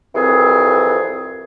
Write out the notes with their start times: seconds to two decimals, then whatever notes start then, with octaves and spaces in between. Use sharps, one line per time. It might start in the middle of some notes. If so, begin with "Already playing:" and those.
0.15 C2 F2 E3 C4 G#4